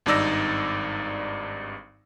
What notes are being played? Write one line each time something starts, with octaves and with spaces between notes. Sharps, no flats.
G#1 G2 D#4 D5 E6 A#6